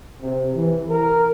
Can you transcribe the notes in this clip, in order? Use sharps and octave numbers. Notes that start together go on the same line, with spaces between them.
C3
E3
A#4